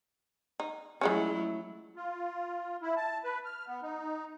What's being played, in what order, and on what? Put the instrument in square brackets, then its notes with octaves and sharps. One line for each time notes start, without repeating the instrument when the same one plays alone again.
[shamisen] D#4
[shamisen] F3 G#3 C#4 [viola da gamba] F#3 A3 E4
[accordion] F4
E4
A5
B4
F6
B3
D#4